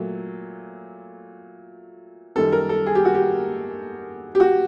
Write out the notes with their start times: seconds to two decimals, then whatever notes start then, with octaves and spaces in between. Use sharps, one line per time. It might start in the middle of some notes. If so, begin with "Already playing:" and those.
Already playing: A#2 F#3 A3
2.36 F#2 D#3 G3 A4
2.52 A#4
2.69 A4
2.86 G#4
2.95 G4
3.05 F#4
3.15 G4
4.35 G4
4.40 F#4